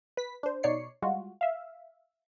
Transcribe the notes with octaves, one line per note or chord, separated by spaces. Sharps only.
B4 B6
D4 C5
B2 D#4 C#5 D5 C7 C#7
G3 G#3 F4 F#4
E5 F5